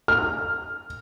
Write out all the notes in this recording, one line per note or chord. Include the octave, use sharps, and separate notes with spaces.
F6